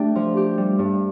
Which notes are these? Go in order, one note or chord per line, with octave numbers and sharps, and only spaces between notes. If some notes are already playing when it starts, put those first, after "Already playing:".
Already playing: A3 D4 G4
F3
G4
G3
G2